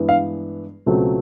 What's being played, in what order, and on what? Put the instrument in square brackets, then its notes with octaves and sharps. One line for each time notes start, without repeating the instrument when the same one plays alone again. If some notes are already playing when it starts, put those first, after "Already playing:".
Already playing: [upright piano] G2 E3 G#3 B3
F5
C#2 B2 F#3 A3 C4